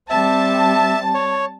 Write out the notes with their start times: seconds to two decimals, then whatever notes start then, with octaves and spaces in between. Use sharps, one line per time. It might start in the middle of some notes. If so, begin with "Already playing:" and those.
0.10 G3 C4 E5 A5
1.14 C#5